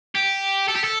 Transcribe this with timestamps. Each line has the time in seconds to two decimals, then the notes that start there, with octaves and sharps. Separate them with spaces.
0.15 G4
0.68 A4
0.76 G4
0.84 A4